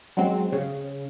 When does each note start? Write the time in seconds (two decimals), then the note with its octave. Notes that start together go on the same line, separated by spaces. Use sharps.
0.17 F#3 G#3 C4
0.52 C#3